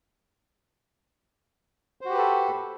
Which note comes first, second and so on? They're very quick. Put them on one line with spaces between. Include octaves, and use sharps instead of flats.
C5 F#4 G4 B4 A4